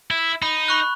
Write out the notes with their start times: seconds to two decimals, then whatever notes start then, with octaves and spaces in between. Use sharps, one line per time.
0.11 E4
0.42 D#4 B5
0.68 B5 C#6 F#6